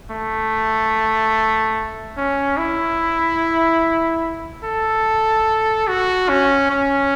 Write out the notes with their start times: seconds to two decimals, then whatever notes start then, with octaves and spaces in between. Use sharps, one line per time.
0.11 A3
2.17 C#4
2.58 E4
4.64 A4
5.88 F#4
6.29 C#4
6.70 C#4